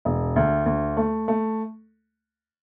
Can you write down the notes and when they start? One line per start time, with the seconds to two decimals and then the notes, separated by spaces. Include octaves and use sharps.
0.05 E1
0.36 D2
0.66 D2
0.97 A3
1.28 A3